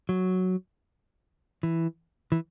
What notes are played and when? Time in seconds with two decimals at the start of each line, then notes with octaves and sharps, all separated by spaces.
0.09 F#3
1.63 E3
2.32 E3